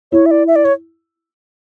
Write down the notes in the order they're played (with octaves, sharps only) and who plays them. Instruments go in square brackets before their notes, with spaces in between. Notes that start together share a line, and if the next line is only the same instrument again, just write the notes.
[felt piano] E4 [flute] C#5
[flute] E5
D5
E5
D5
C#5